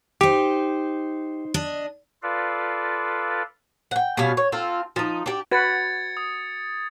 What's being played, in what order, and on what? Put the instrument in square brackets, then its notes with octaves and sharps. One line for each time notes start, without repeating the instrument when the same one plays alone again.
[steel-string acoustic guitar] D#4 C5 [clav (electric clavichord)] G4
[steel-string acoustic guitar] D4 D#5
[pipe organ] F4 A4 B4 D5 F5
[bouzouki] F#5 G5
B2 G3 C#4 F5
C#5
C4 F4 A4
F3 D#4
D4 G4
[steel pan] F#4 B4 [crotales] G#6 A6 C#7
[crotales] D#6